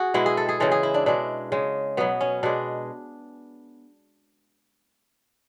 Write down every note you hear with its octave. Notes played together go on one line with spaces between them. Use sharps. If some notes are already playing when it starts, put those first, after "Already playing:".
Already playing: F#4 G#4
B2 G#3 E4
G#4
A4
G#4
C#3 E3 G#3 A4
G#4
E4
D4
B2 G#3 D4
C#3 G#3
B2 F#3 B3
C#4
B2 G#3 D4